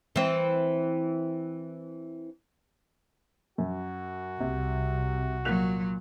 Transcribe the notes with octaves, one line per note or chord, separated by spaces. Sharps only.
E3 C4
F#2 F#4
C2 C3
A#2 F#3 F#6 F7